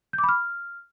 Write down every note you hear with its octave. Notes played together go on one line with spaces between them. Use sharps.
G6
D6
B5
F6